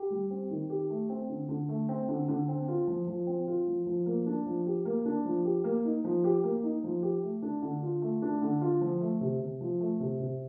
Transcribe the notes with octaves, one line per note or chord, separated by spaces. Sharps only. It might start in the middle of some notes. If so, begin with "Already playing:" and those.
Already playing: G4
G3
C4
D#3
G4
A3
C4
D3
D3
A3
C4
D3
D3
C4
F4
F3
F3
C4
F4
F3
F3
A#3
D4
F3
G4
A#3
D4
F3
G4
A#3
D#4
F3
G4
A#3
D#4
F3
G4
A3
D4
D3
F4
A3
D4
D3
F4
F3
A3
C3
C3
F3
A3
C3
C3